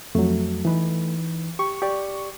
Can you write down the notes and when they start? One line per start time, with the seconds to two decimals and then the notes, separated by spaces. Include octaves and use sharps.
0.15 F2 F#3 A3
0.65 E3 D#4 B4
1.59 G4 C#6
1.82 G4 D5